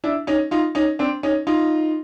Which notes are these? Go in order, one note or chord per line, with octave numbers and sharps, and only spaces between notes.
D4 E4
C#4 D#4
D#4 F4
C#4 D#4
C4 D4
C#4 D#4
D#4 F4